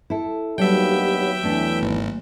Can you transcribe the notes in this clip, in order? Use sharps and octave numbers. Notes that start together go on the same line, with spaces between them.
E4 A4
D#2 F#3 G3 B3 D4 G4 E5 G5
C#5
E2 E3 A3 D4
G#1 A#3